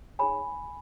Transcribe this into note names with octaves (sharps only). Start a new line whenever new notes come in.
D#4 G#4 C#5 G#5 B5